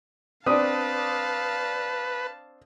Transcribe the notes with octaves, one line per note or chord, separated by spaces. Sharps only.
C4 D4 B4 D5 F5 A5 D#6